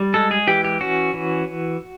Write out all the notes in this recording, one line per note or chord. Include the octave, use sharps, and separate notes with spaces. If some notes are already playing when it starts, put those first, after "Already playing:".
Already playing: G3
G#3 A4
G#4
E3 G4
G4
C#4 F#4
E3